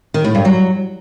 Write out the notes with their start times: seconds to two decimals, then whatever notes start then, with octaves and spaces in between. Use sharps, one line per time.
0.14 D#3
0.24 A2
0.35 G2
0.45 F#3